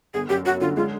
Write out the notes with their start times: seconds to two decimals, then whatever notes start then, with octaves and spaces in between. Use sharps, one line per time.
0.14 G1 G#4
0.29 F#2 G4
0.45 F#3 F#4
0.61 D3 F4
0.76 G#3 F4